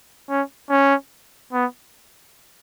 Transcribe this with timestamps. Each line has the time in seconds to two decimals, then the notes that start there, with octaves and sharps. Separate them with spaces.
0.29 C#4
0.70 C#4
1.53 B3